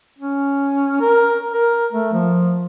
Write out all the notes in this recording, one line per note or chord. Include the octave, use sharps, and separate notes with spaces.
C#4
A#4
A#4
A3
F3